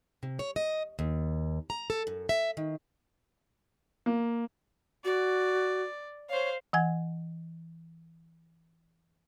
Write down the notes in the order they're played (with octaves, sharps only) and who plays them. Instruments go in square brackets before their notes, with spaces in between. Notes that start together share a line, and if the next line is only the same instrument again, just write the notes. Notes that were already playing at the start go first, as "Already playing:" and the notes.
[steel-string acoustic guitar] C3
C#5
D#5
D#2
A#5
A4
F#2
E5
D#3
[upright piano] A#3
[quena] F#4 [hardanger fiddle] D5
[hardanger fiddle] C5 F5 [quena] C#5
[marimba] E3 F#5 G#5 G#6